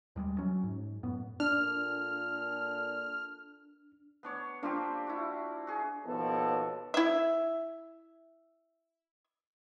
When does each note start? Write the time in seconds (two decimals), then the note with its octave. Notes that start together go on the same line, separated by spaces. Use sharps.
0.16 D#2 G3 G#3
0.38 F#3 C#4
0.63 G#2
1.03 F#2 A2 B3
1.40 A#2 D4 A4 F6
4.23 B3 D4 C#5
4.63 A#3 C4 D4 F4 G4
5.07 E4 F#4
5.67 F#4 G#4
6.05 D#2 B2 F3 B3 A4 C#5
6.94 E4 E5